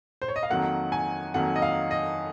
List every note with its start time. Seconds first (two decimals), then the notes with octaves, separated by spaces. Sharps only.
0.22 C5
0.28 C#5
0.36 D#5
0.43 F5
0.50 F2 D#3 F#3 A#3 F#5
0.92 G#5
1.34 F2 D#3 F#3 A#3 F#5
1.56 D#5
1.62 F5
1.91 D#5